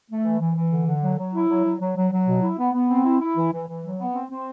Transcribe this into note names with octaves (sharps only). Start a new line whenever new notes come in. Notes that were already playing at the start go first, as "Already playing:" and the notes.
A3
E3
E3
E3
D3
D3
F#3
F#3
E4
F#3
F#3
F#3
F#3
F#3
B2
E4
B3
B3
C4
E4
E4
E3
E3
E3
F#3
B3
C4
C4